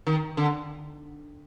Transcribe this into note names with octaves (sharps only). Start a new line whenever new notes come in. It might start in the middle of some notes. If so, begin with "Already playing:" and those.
D#3
D3